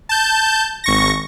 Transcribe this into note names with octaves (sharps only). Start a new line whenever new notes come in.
A5 G6
G#1 C#6 A#6